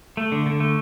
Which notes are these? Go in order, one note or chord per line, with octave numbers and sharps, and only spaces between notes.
A3
D3
D3
A3